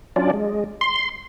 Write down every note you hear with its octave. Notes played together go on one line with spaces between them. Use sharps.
F#3 C#4 D4 F4 D5
G#3
C6